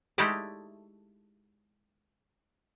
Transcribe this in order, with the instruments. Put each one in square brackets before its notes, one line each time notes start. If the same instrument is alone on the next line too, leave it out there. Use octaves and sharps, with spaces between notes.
[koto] G#3 A3 D#4 E4 G4 D5